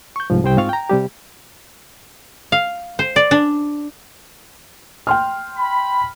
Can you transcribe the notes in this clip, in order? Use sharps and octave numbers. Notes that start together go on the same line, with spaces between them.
C#6 G6
C2 G#2 F3
C2 G3 C5 G5
G#2 C4 F4 F5 C#6 F6
G5 A#5
C3 G3 G4
F5
C5
D5
D4
G5 C6 F6
B5